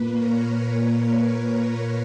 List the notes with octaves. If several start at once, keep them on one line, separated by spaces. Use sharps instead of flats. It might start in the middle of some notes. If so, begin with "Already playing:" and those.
Already playing: A#2 A#3 B4
A#4 C#5
A#4 C#5